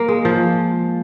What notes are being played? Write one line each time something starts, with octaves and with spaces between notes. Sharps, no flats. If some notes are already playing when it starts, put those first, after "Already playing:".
Already playing: A#3
G#3
F3